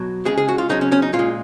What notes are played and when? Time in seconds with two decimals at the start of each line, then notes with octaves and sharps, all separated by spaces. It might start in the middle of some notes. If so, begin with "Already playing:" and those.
Already playing: B2 F#3
0.25 C#3 G#3 G#4
0.38 G#4
0.49 F#4
0.58 F4
0.69 C#3 F#3 D#4
0.81 C#4
0.92 C#4
1.02 D#4
1.13 A#2 F4
1.19 G#3